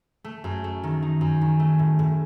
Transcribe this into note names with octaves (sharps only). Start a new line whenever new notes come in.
A3
F#2
A3
D#3
D#4
F#2
D#3
A3
A2
A2